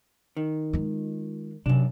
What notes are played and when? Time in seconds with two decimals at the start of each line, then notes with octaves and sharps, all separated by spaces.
0.37 D#3
0.73 G#3 F4
1.66 F#2 C3 D4